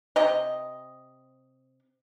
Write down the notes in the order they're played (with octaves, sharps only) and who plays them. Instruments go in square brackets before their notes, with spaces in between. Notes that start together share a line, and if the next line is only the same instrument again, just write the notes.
[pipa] C3 D#5